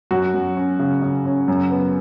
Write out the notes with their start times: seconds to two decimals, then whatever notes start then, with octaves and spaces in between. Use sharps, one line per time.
0.11 F#2 F#4
0.34 F#2
0.57 C#4
0.79 C#3
1.02 C#3
1.25 C#4
1.48 F#2
1.71 B3